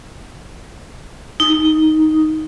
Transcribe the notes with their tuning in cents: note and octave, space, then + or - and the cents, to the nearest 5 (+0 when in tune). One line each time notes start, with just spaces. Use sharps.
D#4 +5